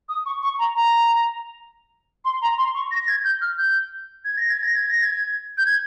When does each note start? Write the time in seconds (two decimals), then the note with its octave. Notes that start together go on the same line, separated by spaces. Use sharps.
0.09 D#6
0.26 C#6
0.43 C#6
0.59 A#5
0.75 A#5
2.25 C6
2.42 A#5
2.58 C6
2.75 C#6
2.91 A#6
3.02 A#6
3.08 G#6
3.24 G6
3.41 F6
3.58 G6
4.25 G#6
4.37 A#6
4.50 G#6
4.63 A#6
4.76 G#6
4.89 A#6
5.02 G#6
5.58 G6
5.66 G#6